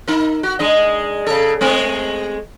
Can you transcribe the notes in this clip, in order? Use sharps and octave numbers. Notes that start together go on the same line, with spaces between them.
D#4 A#4
F#4
G#3 D4 D#5
C#3 A4
G#3 A3 C4